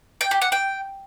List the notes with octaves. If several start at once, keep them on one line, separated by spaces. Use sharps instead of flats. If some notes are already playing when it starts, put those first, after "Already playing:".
G5
G4
F#5
G5